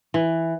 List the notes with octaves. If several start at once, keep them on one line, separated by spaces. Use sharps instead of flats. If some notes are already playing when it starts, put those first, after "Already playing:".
E3